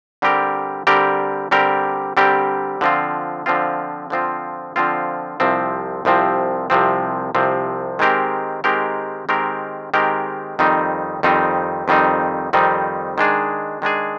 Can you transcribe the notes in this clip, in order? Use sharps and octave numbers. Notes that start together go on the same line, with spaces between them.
D3 G3 C4 G4 A#4
D3 G3 C4 G4 A#4
D3 G3 C4 G4 A#4
D3 G3 C4 G4 A#4
D3 F3 C4 F4
D3 F3 C4 F4
D3 F3 C4 F4
D3 F3 C4 F4
C2 C3 F3 C4
C2 C3 F3 C4
C2 C3 F3 C4
C2 C3 F3 C4
D#3 G#3 C4 G4 A#4
D#3 G#3 C4 G4 A#4
D#3 G#3 C4 G4 A#4
D#3 G#3 C4 G4 A#4
F2 D#3 G3 C4 D#4
F2 D#3 G3 C4 D#4
F2 D#3 G3 C4 D#4
F2 D#3 G3 C4 D#4
D#3 G#3 D4 G#4
D#3 G#3 D4 G#4